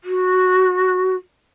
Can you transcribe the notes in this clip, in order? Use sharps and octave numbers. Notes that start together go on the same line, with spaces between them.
F#4